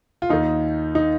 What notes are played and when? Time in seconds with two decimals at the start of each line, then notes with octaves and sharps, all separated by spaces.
0.22 F4
0.30 D#2 D#3 D#4
0.95 D#4